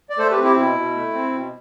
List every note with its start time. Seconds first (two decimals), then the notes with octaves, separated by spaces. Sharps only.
0.10 D5
0.18 A3 A4 C5
0.31 G4 B4
0.38 C4
0.44 E4 G4
0.56 B2 E4
0.75 B2
0.95 A3
1.13 C4
1.32 B2